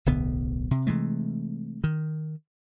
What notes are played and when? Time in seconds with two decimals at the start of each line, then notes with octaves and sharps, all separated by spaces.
0.06 D1 B1 D3 B3
0.71 C3
0.87 C3 E3 G#3 A3
1.84 D#3